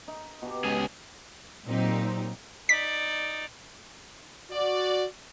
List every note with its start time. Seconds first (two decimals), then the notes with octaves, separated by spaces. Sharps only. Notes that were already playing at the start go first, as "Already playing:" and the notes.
0.08 D#4
0.42 B2 G4
0.64 C#2 G#4
1.66 A#2 F#3 C4 D#4 G4
2.69 D#4 D5 B6
4.52 F#4 D5